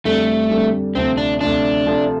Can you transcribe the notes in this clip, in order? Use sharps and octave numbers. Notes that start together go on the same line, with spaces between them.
F2 D3 G3 A3 D4
F2 D3 G3 D4
D2 C3 F3 C4
D4
D2 C3 F3 D4
C3 F3 A3